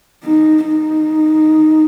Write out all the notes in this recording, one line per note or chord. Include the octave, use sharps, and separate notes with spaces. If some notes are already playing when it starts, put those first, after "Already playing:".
D#4
D#4